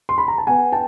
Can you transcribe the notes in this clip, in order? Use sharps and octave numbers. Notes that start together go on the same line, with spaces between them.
C6
B5
A#5
A5
B3 F#5 G#5
G5 A5